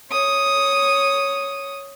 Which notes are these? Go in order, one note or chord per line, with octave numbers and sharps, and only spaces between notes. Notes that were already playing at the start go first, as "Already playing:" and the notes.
C#5 D#6